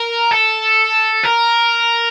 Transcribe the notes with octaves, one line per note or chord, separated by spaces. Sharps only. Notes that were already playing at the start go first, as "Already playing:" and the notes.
Already playing: A#4
A4
A#4